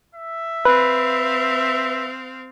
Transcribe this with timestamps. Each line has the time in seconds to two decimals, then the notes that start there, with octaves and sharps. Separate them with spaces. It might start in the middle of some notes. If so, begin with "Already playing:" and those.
0.15 E5
0.65 C4 B4 F5